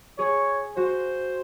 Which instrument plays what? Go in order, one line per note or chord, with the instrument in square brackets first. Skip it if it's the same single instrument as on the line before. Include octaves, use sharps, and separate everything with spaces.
[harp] G#4 [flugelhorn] C#5
[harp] F#4 [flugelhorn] C5